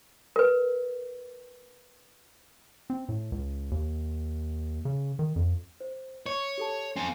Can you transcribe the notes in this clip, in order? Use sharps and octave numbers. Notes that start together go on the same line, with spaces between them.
A#4 B4
C4
A2
C#2
D#2
C#3
D#3
F2
C5
C#5 C#6
G4 A4 A5
C4 A4 G#5